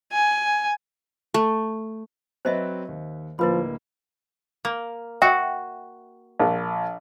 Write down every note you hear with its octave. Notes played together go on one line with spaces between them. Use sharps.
G#5
A3
F#3 C4 B4 C5 D#5 E5
D#2
D1 F3 A#3 E4 B4 B5
A#3
F#4 E5 G5
A#1